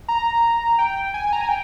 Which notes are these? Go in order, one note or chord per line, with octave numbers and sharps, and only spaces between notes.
A#5
G5
G#5
A#5
G#5
G5